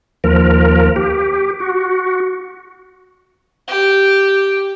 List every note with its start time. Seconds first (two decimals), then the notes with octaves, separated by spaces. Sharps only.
0.24 D#2 F3 A#4
0.96 G4
1.60 F#4
3.68 G4